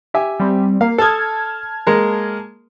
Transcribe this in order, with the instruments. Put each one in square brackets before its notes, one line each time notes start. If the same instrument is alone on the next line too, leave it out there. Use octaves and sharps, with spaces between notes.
[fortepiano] G4 E5 G#5
[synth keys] G3 C4
[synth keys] A#3 [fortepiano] F5
[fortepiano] A4 D#6 [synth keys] A5 F6 G#6
[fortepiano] G#3 A#3 A#4